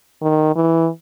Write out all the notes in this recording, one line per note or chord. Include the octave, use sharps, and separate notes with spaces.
D#3
E3